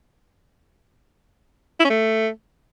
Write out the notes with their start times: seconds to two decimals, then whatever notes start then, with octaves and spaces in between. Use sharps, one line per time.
1.80 E4
1.85 C#4
1.90 A3